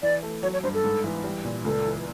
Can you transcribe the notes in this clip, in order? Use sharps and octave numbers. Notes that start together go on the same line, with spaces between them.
E3 D5
A3
F#3 C#5
C#5
G2 C5
A4
G#2
E3
G3
A#2
C#2 A4
E3